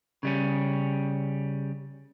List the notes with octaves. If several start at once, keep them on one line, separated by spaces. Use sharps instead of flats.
C#3 G3 C#4